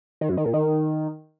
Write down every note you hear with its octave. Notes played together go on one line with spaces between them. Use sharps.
D#3
F#2
D#3
A#2
D#3